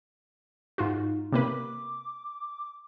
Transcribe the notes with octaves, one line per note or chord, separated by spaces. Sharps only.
G#2 D#4 F4 F#4
C3 A#3 B4 D6